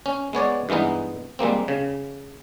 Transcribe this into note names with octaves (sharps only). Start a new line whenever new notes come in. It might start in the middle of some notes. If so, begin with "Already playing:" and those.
C#4
G#3 B3 C#5 D5
G2 E3 G#3 B3 D#4
G3 G#3 A#3 C4
C#3